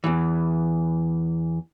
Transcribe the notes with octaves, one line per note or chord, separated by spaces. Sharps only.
E2 E3